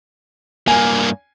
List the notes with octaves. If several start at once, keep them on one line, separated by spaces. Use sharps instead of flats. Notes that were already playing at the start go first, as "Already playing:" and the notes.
G2 A#3 G#5